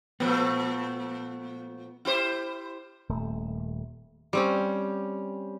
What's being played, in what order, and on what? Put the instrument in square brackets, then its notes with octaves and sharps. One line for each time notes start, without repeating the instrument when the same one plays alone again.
[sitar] A#2 F3 A3 [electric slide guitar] B3
[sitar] E4 G4 C5
[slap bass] D#1 A3
[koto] G3 C4 C#4